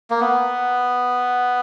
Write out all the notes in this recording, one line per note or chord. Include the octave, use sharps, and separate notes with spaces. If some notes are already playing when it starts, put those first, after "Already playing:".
A#3
B3